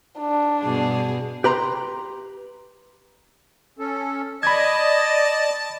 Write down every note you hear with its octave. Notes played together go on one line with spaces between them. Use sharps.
D4
G2 B2 G#4
G4 B4 A#5 C6
C#4 A4
D5 D#5 A5 B5 D#6 G#6